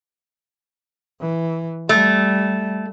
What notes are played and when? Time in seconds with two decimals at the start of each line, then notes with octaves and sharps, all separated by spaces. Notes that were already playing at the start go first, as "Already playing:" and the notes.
1.21 E3
1.89 G3 A3